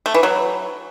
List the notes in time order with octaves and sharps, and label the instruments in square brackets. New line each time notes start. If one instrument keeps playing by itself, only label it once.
[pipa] A3
E3
F#3